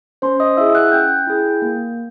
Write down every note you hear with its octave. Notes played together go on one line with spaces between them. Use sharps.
C#4 C5 C6
D#5 D#6
E4 G#4 E5 E6
F#5 F#6
C#4 G5 G6
E4 G#4
A#3